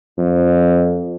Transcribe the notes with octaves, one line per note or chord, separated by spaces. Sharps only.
F2